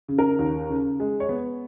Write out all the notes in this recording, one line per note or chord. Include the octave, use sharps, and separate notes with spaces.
C#3
A#4
D#2
C#3
G#3
C#5
B3